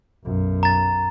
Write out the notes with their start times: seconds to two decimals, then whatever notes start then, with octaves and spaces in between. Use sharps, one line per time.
0.24 B1 F#2
0.63 A#5 A6